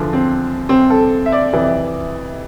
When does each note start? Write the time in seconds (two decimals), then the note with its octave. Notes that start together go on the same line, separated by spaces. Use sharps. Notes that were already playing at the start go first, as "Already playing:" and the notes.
Already playing: E2 D3 F3
0.13 C4
0.69 C4
0.90 A4
1.26 E5
1.32 D5
1.53 F2 C3 E3